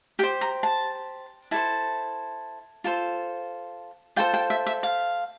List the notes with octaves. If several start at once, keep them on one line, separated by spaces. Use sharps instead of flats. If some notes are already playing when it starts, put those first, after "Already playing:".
G4 C5 G5
A#5
A5
E4 A4 C5 A5
F4 A4 C5
F4 A4 C5 G5
G5
E5
E5
F5